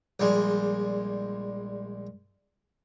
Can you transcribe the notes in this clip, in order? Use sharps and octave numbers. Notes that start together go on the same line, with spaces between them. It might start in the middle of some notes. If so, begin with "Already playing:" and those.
A#1 G3 G#3